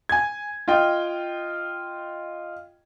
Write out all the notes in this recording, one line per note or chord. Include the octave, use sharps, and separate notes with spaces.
G#5 G#6
F4 D#5 G5